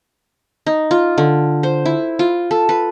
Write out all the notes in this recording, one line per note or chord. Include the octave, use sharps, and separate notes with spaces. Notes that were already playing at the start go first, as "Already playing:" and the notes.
D#4
F4
D3
C5
E4
F4
A4
B4